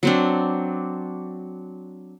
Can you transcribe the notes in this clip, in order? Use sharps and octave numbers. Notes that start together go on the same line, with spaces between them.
F#3 C4 D4